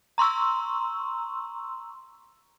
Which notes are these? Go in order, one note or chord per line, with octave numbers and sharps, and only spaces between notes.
A#5 C6 C#6 E6